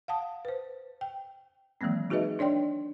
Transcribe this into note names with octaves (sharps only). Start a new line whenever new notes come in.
F5 F#5 A5 D#6
B4 C5
G5
D#3 E3 F#3 G#3 A#3 C4
D#4 F#4 G#4 B4 D#5 E5
D4 C#5 D5 G5 C6